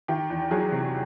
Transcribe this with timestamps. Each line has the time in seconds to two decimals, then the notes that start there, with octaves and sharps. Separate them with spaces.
0.08 D#3 G4
0.30 E2
0.51 F#3 G#4
0.72 C3